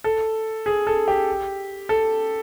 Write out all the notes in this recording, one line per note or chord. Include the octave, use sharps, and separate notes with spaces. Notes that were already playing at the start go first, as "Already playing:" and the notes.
A4
G#4
A4
G4
A4